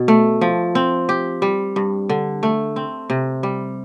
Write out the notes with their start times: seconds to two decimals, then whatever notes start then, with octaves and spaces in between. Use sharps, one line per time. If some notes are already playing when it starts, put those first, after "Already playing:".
Already playing: B2
0.08 A3
0.41 F3
0.75 C4
1.09 G4
1.42 G3
1.76 G2
2.09 D3
2.43 A3
2.76 C4
3.10 C3
3.43 G3